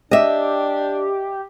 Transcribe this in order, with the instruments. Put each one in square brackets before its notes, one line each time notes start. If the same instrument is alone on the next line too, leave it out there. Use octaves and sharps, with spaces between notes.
[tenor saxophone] D4 [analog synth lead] G4 [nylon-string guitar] D#5 E5